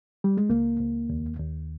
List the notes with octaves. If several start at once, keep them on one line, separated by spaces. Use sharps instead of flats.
G3
G#3
C#2 A#3
C#2
D#2
D#2